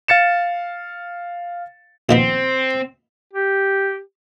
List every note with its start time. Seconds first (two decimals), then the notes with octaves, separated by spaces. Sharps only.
0.08 F5 A6 C#7 E7
2.09 A#1 D#3 B3 C4
3.33 G4